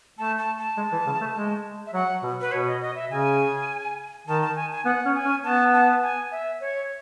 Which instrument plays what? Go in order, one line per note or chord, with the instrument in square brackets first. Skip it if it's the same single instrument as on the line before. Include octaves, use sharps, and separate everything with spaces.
[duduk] A3 [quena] A5
[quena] A5
A5
[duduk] G#3
E3
C#3
A3
G#3
[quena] E5
[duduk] F#3 [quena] F#5
[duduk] B2
[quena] B4
[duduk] B2 [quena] C#5
[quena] D#5
D#5
E5
[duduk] C#3 [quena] G#5
[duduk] D#3 [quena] A5
[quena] A5
G#5
G#5
[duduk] B3 [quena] F#5
[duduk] C#4
[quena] G#5
[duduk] C#4
[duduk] B3 [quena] A5
[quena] A5
G#5
E5
C#5